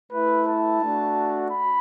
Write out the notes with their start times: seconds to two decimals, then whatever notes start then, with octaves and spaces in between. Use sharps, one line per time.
0.12 A3 E4 B4
0.47 A5
0.81 A3 D4 F#4
1.51 B5